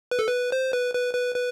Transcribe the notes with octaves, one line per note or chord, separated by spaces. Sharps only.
B4
A4
B4
C5
B4
B4
B4
B4